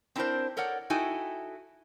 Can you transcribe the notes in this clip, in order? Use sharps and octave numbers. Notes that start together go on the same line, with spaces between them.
C4 D4 E4 G4 A#4 C5
A4 A#4 C#5 D5 F#5
D#4 E4 F#4 A4 G5 G#5